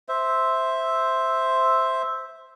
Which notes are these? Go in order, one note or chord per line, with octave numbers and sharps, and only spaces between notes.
C5 E5